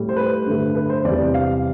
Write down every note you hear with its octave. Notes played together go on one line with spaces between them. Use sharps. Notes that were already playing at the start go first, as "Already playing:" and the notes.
Already playing: A2 G3
C5
B4
G2 D3 A3
B4
C5
E2 C3 G3 D5
F5